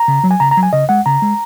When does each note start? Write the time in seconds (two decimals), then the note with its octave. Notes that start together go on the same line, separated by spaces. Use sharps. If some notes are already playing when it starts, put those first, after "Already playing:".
Already playing: A#5
0.08 C#3
0.24 F#3
0.31 G#5
0.40 C#3 A#5
0.51 A#5
0.57 F#3
0.63 G#5
0.73 C#3 D#5
0.89 G#3 F#5
1.06 C#3 A#5
1.22 G#3